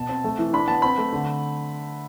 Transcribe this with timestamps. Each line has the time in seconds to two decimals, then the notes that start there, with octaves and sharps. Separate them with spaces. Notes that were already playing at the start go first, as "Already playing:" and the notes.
Already playing: B2 A5
0.09 C4
0.24 A3
0.39 E3
0.53 D4 B5
0.67 B3 A5
0.82 C4 B5
0.98 A3
1.13 D3